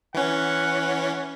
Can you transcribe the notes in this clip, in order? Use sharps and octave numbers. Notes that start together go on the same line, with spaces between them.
E3 C#4 F#5